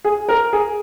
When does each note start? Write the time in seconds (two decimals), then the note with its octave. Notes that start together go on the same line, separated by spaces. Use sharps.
0.04 G#4
0.29 A#4
0.53 G#4